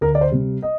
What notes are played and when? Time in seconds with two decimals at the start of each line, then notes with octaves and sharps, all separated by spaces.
0.01 D2 A#4
0.15 D5
0.21 C5
0.31 C3 G3
0.62 D#5